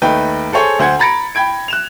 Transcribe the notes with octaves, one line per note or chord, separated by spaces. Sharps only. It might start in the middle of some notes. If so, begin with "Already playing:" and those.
D#2 A3 D#4 B4 G5
G#4 A4 C5 C#5 G#5
D2 C5 F#5 G#6
A#5 B5 A6 A#6 C#7 D7
G5 B5 G#6 D7
F#6 E7 F7